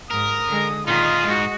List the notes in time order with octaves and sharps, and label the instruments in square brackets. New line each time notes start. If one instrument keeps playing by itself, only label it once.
[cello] G#2 [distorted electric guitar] A#4 [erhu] D#6
[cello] D3 G#3
[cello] A#2 D#3 [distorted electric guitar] D#4 G#4 [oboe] F4 [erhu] D#5
[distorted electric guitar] G#2 [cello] G#3 F#4